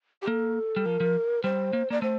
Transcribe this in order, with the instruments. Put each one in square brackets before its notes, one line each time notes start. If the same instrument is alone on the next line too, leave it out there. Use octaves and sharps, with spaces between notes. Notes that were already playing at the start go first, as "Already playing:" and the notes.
[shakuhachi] G4
[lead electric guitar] A#3 [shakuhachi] A4
[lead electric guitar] G3
[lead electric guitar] F3 [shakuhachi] A#4
[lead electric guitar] F3
[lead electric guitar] G3 [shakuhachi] C5
[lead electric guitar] A#3
[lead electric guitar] A#3 [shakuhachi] D5
[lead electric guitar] A3 [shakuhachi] C5